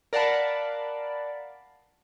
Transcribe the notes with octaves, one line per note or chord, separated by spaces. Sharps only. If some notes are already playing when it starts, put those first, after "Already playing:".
A#4 D5 F5 F#5 A5 B5